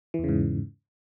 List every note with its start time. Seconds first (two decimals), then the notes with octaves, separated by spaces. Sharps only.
0.14 E3
0.19 E2
0.24 C#3
0.29 G#2